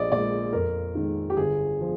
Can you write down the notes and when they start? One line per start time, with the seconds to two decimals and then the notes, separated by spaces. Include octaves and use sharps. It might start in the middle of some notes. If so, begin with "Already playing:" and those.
Already playing: A#1 D5 D#5
0.11 A#2 G#3 D5
0.53 F2 A#4
0.95 D#3 G#3
1.30 G4
1.37 G1 G#4
1.81 F3